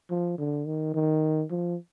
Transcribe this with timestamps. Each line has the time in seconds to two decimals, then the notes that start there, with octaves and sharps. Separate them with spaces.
0.10 F3
0.38 D3
0.67 D#3
0.94 D#3
1.51 F3